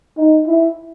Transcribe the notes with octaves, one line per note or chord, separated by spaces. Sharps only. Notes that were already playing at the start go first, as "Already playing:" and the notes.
D#4
E4